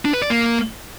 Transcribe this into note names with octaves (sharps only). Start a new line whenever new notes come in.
D4
B4
D5
A#3